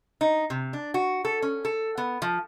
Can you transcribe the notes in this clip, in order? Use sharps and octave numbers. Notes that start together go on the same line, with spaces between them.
D#4
C3
D4
F#4
A4
C#4
A4
B3
F3